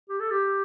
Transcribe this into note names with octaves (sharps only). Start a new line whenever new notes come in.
G4
A4
G4